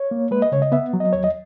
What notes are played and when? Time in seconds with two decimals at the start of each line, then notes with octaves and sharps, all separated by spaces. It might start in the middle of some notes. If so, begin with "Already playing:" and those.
Already playing: C#5
0.11 A#3
0.31 G#3 B4
0.42 D#5
0.52 C#3 C#5
0.62 D#5
0.72 B3 E5
0.93 F#3
1.00 D#5
1.13 D#2 C#5
1.24 D#5